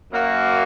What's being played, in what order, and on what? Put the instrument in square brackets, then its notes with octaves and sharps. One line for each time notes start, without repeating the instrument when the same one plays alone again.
[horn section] F#2 F#3 A#3 F#4